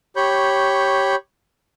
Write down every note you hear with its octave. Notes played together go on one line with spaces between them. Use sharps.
G4 C#5 B5 C#6 G6